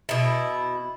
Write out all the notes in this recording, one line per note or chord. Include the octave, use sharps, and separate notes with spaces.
B2 E4